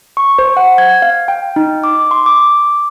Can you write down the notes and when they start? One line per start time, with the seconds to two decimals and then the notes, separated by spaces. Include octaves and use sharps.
0.17 C#6
0.39 C5
0.57 F#5
0.78 G#6
1.02 F5
1.28 G5
1.56 D#4
1.84 D6
2.11 C6
2.26 D6